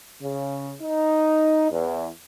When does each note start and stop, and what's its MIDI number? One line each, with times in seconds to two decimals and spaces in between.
0.22 0.74 49
0.81 1.68 63
1.71 2.08 40